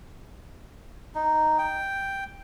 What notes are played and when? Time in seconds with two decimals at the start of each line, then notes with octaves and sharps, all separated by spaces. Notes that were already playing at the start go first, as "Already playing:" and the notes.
1.15 D#4
1.58 G5